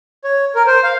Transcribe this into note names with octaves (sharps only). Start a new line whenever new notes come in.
C#5
A#4
C5
F5